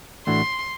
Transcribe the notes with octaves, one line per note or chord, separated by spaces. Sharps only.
A2 E3 A3 D4 F#4 C6